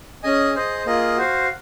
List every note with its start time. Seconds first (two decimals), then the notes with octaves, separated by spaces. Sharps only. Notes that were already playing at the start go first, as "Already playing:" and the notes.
0.23 C#4 G#4 D#5 G#5
0.54 G#4 C5 D#5
0.86 A#3 F4 G#4 D#5
1.16 F#4 C5 F5